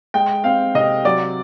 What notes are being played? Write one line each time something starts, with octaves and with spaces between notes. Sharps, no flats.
G#3 G5
C4 F5
C3 D#5
F#3 D5